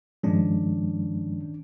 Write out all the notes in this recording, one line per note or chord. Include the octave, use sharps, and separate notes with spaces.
G2 D#3 F3 G#3 C#4 D4